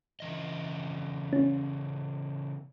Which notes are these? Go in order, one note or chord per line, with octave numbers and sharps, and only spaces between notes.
C#3 E3 D#5
C#4